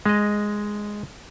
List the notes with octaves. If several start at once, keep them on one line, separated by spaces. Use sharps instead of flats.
G#3 D#5